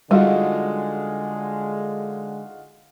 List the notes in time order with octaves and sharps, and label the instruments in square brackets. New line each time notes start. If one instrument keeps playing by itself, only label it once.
[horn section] D3 G#3 [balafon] G3 [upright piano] D#4 F4 F#4